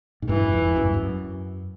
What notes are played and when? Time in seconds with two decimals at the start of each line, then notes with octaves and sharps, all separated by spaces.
0.22 G#2
0.29 G2 E3
0.41 F#2
0.52 F2
0.65 F2
0.76 F#2
0.85 G2
0.94 F#2